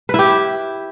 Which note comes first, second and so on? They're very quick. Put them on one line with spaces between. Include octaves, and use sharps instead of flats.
B4 E4 G4